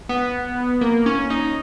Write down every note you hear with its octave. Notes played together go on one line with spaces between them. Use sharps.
B3
A#3
C#4
D#4